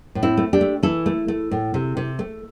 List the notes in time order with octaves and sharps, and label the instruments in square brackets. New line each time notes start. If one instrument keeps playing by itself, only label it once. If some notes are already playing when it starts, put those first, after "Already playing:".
[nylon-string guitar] A2
C4 E4
A3
D4 G4
A3
E3 E4 A4
A3
A3
A2
C3
C3
A3